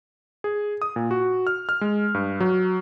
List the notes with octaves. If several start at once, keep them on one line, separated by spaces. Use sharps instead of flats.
G#4
D#6
A#2
F#4
F6
F6
G#3
G2
F#3